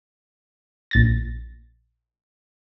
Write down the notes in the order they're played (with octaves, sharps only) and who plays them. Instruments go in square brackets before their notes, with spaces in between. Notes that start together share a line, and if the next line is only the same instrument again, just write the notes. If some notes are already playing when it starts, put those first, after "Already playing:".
[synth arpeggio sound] A#1 A6 A#6